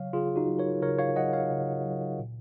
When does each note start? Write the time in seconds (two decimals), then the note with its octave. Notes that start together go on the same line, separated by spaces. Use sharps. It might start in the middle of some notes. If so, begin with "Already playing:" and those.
Already playing: C#3 F#3 C#5 F5
0.13 C#3 F4 G#4
0.36 D#4 F#4
0.48 F#3
0.59 A#4 C#5
0.82 C#3 A#4 C#5
0.99 C#5 F5
1.16 F#3 D#5 F#5
1.33 C#5 F5
1.51 C#3
1.85 F#3
2.19 A#2